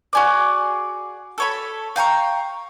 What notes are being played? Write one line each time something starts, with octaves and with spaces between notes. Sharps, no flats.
F#4 G#4 D5
A4 C#5 B5
F5 G5 A#5 C#6